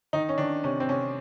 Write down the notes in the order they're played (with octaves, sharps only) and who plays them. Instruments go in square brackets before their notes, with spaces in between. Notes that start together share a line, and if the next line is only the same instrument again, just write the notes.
[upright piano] D#3 D#4
C#4
D#3 D4
C3 C#4
C4
C3 C#4